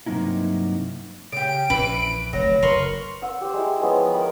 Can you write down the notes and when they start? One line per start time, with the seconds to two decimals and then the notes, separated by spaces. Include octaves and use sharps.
0.06 G2 C3 F#3 A#3 D#4 E4
1.32 C#3 G4 D7
1.70 A#1 E3 C#4 B4
2.33 F1 D2 F#3 A3 A#6
2.62 F#1 A#4 B4 C6 C#6
3.22 F#5 E6
3.41 G4 C5
3.54 G#3 E4
3.82 F3 G#3 B3 C#4
4.14 A#4 G5 B5